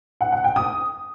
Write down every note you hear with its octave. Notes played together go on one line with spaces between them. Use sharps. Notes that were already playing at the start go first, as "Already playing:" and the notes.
F#5
F#5
G5
D#6